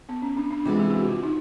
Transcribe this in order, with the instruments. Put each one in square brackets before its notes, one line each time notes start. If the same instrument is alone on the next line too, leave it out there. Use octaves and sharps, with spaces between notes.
[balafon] B3
C#4
D4
D4
[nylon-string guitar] C3 E3 G#3 B3 E4 [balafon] F4
[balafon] G4
G4
F#4
F4
D#4